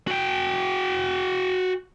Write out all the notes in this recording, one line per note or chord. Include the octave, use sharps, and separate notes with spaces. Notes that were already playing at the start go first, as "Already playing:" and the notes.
F#4 G5